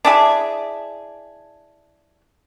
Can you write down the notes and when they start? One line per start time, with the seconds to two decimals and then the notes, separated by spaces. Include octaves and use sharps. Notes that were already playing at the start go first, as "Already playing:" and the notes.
0.05 D4 E4 G#4